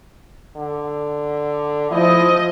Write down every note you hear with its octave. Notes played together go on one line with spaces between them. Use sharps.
D3
F3 E4 D#5